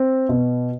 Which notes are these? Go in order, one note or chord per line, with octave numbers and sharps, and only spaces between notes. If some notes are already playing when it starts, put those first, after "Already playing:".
Already playing: C4
B2